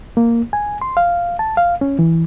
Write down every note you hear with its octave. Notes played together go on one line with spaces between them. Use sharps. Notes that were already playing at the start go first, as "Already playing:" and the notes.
A#3
G#5
C6
F5
A5
F5
C#4
E3